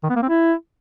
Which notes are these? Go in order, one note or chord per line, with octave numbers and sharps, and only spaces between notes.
D#3
B3
A#3
C4
E4